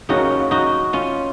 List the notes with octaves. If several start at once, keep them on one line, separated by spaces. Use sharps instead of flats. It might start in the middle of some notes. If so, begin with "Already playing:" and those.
D#2 C#3 F#3 A#3 C#4 D#4 F#4
D#4 F#4
C#4 F4